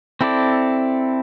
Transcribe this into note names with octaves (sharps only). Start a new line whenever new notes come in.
C4 E4 A4 D5